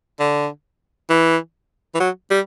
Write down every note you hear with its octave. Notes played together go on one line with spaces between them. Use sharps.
D3
E3
E3
F#3
G3